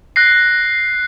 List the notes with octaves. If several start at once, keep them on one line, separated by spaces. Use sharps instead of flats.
F#6 A#6 C7